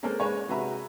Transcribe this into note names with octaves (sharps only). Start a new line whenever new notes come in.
G#3 A#3 C4 C#4 A4 A#4
G#3 C#4 B4 C#5
C3 G#3 F#4 B4 E5 A#5